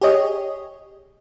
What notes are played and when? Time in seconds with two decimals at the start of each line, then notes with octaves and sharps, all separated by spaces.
0.01 G4 G#4 C#5 D#5